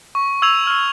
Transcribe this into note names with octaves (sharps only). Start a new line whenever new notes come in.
C#6
C#6 E6 G#6 D#7 F7
E6 F6